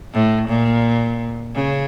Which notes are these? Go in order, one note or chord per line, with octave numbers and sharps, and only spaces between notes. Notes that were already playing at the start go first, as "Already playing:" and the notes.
A2
A#2
C#3